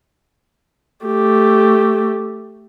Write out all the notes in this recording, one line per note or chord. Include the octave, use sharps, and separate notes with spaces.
A3 G4